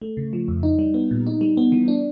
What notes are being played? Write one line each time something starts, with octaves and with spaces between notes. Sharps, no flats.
A3
C#3
F3
F2
D#4
G3
B3
A#2
D#4
G3
B3
E3
D4